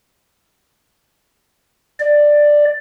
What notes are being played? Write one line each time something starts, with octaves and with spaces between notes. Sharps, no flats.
D5